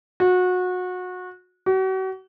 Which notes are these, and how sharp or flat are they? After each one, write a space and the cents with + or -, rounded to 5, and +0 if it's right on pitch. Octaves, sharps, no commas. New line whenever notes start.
F#4 -25
F#4 +40